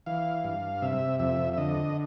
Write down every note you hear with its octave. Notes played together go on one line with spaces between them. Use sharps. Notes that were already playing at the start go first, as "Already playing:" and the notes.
E3 F5
G2
C3 E5
F2 E5
E5
D3 D#5